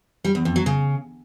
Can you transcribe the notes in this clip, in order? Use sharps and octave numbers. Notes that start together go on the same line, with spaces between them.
G3
E2
F2
F#3
C#3